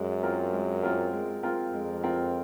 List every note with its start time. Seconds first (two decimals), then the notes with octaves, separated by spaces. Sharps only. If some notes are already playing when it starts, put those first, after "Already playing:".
Already playing: F#2 G#3
0.23 C4 F4 A#4
0.53 G#3
0.83 C4 F4 A#4
1.13 G#3
1.43 C4 F4 A#4
1.73 F2 G#3
2.03 C4 F4 A#4